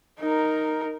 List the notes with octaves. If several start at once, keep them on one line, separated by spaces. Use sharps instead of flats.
D#4 A#4